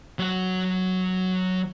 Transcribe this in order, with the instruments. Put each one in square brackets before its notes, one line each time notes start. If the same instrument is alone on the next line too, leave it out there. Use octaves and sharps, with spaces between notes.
[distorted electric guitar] F#3 F#5